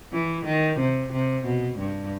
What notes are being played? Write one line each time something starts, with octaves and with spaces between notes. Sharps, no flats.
E3
D#3
C3
C3
B2
G2